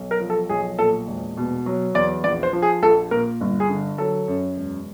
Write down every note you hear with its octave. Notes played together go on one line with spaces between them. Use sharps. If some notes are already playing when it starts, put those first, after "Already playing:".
Already playing: B1
A#4
F3
A4
B1 G#4
A#2 A4
E1
B2
F#3
E2 D5
A#1 D5
C5
F3
G#4
A#1 A4
A#2 A#4
G1
G#4
D3
F#3 A4
F#2
E1